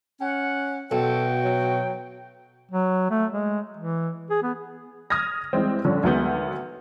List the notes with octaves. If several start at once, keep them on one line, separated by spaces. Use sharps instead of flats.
C#4 F#5
B1 F#4 A4 G5
F#3
F#3
A3
G#3
E3
G#4
B3
D#6 F6 G#6 A#6
E3 G3 G#3 C4
D3 F3 G3 C#4
D2 D#3 F#3 G#3 B3 G6